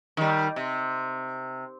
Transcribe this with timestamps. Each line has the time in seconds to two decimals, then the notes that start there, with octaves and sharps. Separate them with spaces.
0.17 D#3 G3
0.56 C3